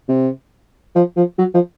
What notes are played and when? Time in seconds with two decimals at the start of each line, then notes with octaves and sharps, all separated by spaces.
0.09 C3
0.95 F3
1.16 F3
1.38 F#3
1.54 F3